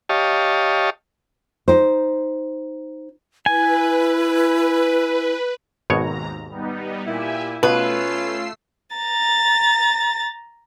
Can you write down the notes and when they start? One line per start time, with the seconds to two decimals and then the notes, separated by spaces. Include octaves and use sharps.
0.09 G4 C#5 D#5 F5 A5
1.68 D#4 C5
3.46 E4 B4 G#5
5.90 G#1 D#2 G#2 B2 C#5 A#5
6.49 G3 B3 D#4
7.06 A#2 E4 G4 E5 G#5
7.63 B2 A3 C#4 F4 B4 E6 C7
8.96 A#5 A6